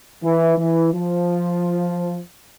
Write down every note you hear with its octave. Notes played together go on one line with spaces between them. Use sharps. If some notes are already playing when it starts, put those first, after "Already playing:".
E3
E3
F3